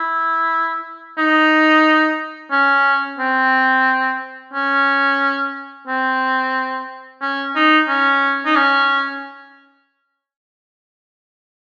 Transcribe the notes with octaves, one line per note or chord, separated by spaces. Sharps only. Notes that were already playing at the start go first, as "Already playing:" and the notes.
Already playing: E4
D#4
C#4
C4
C#4
C4
C#4
D#4
C#4
D#4
C#4